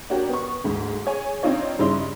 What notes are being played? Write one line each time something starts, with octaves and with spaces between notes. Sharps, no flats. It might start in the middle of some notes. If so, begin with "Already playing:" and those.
D4 F#4 G4 A#4 C#5
B3 C#6
D2 G#2
G#4 C#5 G#5
C4 D4 D#4 F4 C#5 D#5
G2 C#3 C#4 D#4 E4 C6